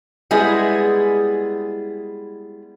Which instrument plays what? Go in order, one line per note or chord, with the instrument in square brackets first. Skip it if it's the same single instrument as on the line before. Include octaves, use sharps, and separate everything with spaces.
[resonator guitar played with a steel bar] G3 G#3 B3 E4 G#4